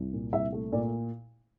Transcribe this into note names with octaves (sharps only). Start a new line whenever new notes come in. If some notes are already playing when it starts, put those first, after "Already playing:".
Already playing: C2
A#2
C2 E5
A3
A#2 D5